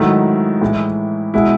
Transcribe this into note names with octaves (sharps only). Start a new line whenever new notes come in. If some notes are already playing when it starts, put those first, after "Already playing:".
Already playing: G#2 D#3 F#3 A3 E4
A2 E3 G#3
B2 G#3 E4